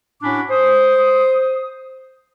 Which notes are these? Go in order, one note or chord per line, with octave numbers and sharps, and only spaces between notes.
A2 C#4 D4 F#4 B5 D6
C5 D#6